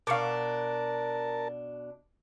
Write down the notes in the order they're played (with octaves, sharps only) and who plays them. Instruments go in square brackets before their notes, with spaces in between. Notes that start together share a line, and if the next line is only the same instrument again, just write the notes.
[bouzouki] B2 D4 [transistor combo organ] A#4 A5 [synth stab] F5 C#6 D6